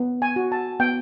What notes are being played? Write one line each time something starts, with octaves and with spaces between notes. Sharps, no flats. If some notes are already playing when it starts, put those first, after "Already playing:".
Already playing: B3
G#5
F#4
A5
B3 G5